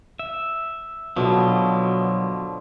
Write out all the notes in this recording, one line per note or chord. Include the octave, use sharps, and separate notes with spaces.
E5
B2 D3 F3 F#3